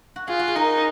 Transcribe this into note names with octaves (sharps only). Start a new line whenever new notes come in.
F#4
F4 G#4
F#4
G#4
D#4 A#4